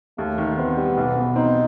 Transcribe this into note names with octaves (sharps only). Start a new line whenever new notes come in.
D#2 A3
D#3
B3 C4
G3
B1
B2
C4 D#4